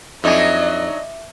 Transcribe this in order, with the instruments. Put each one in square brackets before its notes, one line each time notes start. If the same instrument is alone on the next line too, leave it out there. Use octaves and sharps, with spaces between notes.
[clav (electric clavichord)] F2 G#5 [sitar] F#3 D4 D#4 [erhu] D#5 [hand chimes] E5 D6